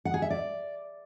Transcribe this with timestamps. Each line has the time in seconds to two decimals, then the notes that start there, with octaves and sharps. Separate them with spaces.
0.05 F#5
0.14 G#4
0.22 E5
0.30 D5